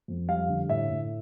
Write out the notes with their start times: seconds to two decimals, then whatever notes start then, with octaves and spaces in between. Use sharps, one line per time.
0.08 F2
0.28 G3 F5
0.48 D3
0.69 A2 E5
0.89 A2